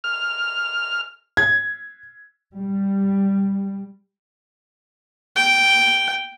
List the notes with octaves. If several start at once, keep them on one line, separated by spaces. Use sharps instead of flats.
F6
G#6
G3
G5